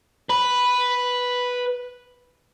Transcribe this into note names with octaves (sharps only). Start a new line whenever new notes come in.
B4 B5